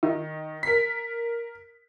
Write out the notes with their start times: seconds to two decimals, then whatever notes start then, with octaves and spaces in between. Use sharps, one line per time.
0.03 D#3
0.63 A#4 B6